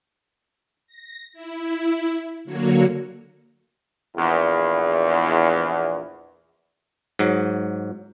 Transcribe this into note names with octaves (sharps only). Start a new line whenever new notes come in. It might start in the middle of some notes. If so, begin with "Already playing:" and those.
A#6
E4
D3 F#3 A#3 F#4 C#5
A#1 E2
G#2 F#3